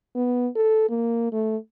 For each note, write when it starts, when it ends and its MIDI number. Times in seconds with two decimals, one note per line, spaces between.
0.15 0.48 59
0.56 0.86 69
0.89 1.28 58
1.32 1.57 57